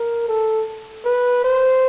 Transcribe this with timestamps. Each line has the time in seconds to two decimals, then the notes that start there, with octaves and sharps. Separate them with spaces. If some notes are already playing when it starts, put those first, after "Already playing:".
Already playing: A#4
0.29 A4
1.05 B4
1.44 C5